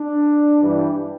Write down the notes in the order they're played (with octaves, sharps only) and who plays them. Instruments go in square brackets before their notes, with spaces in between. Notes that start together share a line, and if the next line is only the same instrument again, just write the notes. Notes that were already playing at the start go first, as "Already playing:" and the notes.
Already playing: [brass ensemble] D4
G2 E3 G3 D4